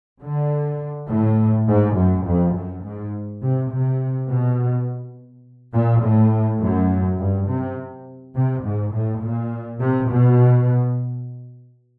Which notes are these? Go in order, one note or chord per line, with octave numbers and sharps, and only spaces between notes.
D3
A2
G#2
F#2
F2
F#2
G#2
C3
C3
B2
A#2
A2
F#2
G2
C3
C3
G#2
A2
A#2
C3
B2